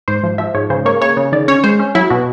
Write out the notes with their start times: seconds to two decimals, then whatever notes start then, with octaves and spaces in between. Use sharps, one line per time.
0.08 G#2 C5
0.23 F3
0.38 F3 E5
0.55 G#2 C#5
0.70 C#3 C5
0.86 A#3 C#5
1.01 C#3 C#5
1.17 C#3
1.32 D#3 D5
1.48 C#4 C#5
1.64 G#3 C5
1.79 C#4
1.95 F#3 E4
2.10 B2 F#4